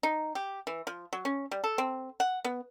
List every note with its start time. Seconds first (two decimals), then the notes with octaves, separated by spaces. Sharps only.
0.03 D#4
0.35 G4
0.67 E3
0.87 F3
1.13 F#3
1.25 C#4
1.51 G3
1.64 A4
1.78 C4
2.20 F#5
2.45 B3